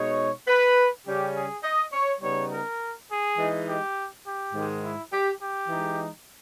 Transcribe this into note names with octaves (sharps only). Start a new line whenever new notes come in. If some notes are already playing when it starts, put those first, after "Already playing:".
Already playing: B2 G#3 D#4 C#5
B4
C#3 G3 C#4 G4
G#4
D#5
C#5
C#3 G3 B3 D#4 C#5
A#4
G#4
E3 G#3 D#4
G4
G4
G#2 D#3 G#3
E4
G4
G4
E3 G#3 D#4